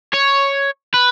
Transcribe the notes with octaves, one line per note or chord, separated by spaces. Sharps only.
C#5
B4